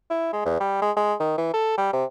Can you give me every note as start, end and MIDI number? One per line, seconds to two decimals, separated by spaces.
0.10 0.32 64
0.33 0.45 56
0.46 0.60 40
0.60 0.79 55
0.82 0.91 56
0.96 1.14 56
1.20 1.34 51
1.38 1.53 52
1.54 1.77 69
1.78 1.90 55
1.93 2.05 48